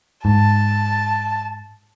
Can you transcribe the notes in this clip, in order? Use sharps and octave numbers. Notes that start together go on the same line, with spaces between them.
G#2 A5